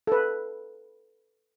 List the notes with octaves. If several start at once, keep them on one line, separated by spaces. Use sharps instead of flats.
A4 B4